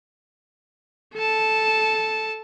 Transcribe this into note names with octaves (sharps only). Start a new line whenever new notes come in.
A4 A5